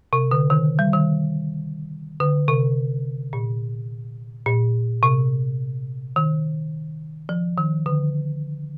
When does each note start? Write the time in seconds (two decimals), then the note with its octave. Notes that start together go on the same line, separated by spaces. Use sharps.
0.13 C3
0.31 D3
0.50 D#3
0.79 G3
0.93 D#3
2.20 D3
2.48 C3
3.33 A#2
4.46 A#2
5.03 C3
6.16 D#3
7.29 F3
7.58 D#3
7.86 D3